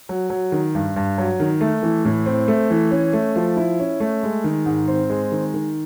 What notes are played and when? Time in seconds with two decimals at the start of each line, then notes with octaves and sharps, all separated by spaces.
0.09 F#3
0.30 F#3
0.52 D#3
0.75 G2
0.96 G2
1.18 F#3
1.40 D#3
1.61 A3
1.83 E3
2.05 A2
2.26 C4
2.48 A3
2.70 E3
2.91 C#4
3.13 A3
3.36 F3
3.57 E4
3.80 C#4
4.00 A3
4.23 G#3
4.44 D#3
4.66 G#2
4.88 C4
5.10 G#3
5.32 D#3
5.54 D#3